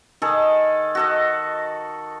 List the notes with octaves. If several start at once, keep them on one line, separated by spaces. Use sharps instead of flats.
D#3 G#4 A4
F#4 A4 D#5